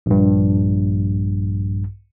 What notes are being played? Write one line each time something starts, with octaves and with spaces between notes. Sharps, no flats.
A#1 G2